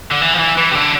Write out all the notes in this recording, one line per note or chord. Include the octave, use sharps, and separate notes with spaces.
D3
E3
F3
E3
E3
C3
D3